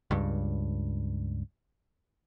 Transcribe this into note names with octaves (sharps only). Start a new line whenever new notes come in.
C#2 G2